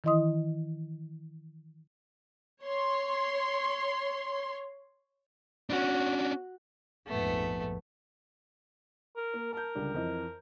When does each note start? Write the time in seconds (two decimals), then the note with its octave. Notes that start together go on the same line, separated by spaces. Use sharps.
0.04 D#3 E3 E4 D#5 C6 D#6
2.63 C#5 C6
5.70 C#4 D4 F#4
7.07 A#1 F2 G#2 A3 B3
9.16 A#4
9.34 A#3
9.53 A#4 A5 G6
9.75 C#2 D3 G3
9.94 F2 E3 D#5